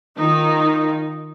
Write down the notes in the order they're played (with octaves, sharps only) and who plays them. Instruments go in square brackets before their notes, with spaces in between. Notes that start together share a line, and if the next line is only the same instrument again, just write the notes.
[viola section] D#3 D#4 F4